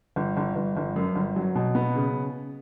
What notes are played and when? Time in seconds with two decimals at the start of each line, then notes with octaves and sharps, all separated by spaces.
0.16 G1
0.37 G1
0.56 G1
0.77 G1
0.96 F#2
1.16 G1
1.36 F#3
1.55 B2
1.75 B3
1.96 C#3